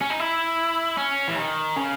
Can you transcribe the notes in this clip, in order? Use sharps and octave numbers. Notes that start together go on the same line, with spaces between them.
C#4
D#4
E4
C#4
E3
D#3
C#3